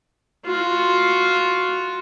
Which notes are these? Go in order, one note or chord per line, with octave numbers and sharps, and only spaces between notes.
F4 F#4